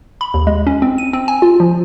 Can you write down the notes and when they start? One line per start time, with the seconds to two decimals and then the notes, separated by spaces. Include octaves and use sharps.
0.21 B5
0.34 D#2
0.47 G#3
0.67 C#4
0.82 C4
0.98 D#7
1.13 C4
1.28 G#5
1.42 F4
1.60 F3